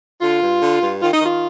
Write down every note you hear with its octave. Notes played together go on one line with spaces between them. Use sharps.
D3 F4
G2
D3
G2
D#3 F4
D#4
D#3 F4